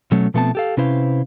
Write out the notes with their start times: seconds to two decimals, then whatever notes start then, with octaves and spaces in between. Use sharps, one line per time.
0.12 B2 F#3 A3 C#4
0.34 B2 F3 A3 B3 C4 A5
0.55 G4 A4 F5
0.77 C3 C#4 E4 B4 C5 F5